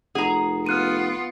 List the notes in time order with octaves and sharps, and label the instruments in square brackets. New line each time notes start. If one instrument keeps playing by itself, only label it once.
[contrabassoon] F1 [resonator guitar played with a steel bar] G#4 A#5 [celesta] F#5
[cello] B3 F4 [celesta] F6 F#6 D#7